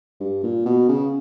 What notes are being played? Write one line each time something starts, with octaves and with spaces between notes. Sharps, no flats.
G2
A#2
B2
C#3